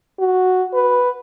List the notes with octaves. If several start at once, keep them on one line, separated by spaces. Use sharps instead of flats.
F#4
B4